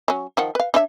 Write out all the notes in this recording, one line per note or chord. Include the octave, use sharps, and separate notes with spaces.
F#3 C#4
D#3 F3 F#5
B4 F5
D4 C#5 E5